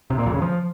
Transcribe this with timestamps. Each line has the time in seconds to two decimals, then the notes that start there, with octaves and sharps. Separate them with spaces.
0.10 C3
0.18 A#2
0.26 F2
0.34 C#3
0.42 F3